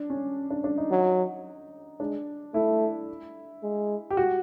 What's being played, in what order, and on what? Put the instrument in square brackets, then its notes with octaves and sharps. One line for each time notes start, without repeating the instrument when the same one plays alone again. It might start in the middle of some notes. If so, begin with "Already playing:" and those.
Already playing: [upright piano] D4
C#4
D4
D4
D#4
[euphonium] F#3
[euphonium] G#3 [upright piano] D4
[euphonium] A3 [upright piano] E4
[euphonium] G#3
[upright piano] G4
F#4